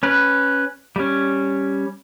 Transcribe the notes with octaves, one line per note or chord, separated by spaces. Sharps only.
C#4 B4
G3 C#4